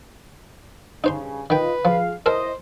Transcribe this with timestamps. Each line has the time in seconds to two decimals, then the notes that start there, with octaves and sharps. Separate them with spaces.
1.04 G2 C#3 D#4 C5 C6
1.50 D#3 F4 B4 D#5 G5
1.85 F3 F4 G#4 F5
2.26 B1 E4 A4 A#4 C5 D#5 A5